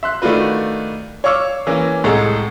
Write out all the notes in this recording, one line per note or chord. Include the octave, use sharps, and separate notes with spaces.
E5 C6 F#6
D#3 A3 D4 F4 F#4 B4
C#5 F5 C#6 D6 E6 F6
E3 A#3 C#4
C2 A2 G#3 G#4 A4 A#5